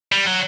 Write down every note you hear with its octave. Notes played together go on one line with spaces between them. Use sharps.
G3
F#3